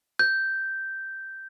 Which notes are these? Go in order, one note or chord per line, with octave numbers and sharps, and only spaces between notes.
G6